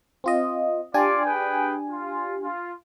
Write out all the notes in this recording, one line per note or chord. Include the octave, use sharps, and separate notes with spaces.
C4 F4 D#5
D4 F4 G4 D5 G#5
G#4 B4 G5
F4
F4